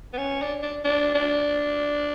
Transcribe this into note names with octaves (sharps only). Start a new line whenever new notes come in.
B3
C#4
D4
D4
D4
D4